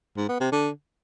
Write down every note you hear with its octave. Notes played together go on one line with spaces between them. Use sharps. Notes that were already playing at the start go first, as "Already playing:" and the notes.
G#2
B3
C3
D3